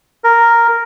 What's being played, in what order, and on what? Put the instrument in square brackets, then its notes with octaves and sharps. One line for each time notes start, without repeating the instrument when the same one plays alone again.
[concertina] A#4